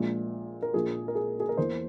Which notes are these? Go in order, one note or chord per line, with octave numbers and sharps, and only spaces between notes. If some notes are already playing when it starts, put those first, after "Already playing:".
Already playing: A#1 A#2 G#3
A#4
A#1 A#2 F3 A#3 G#4
A#4
G#4
G#4
A#4
E2 E3 A#3 C5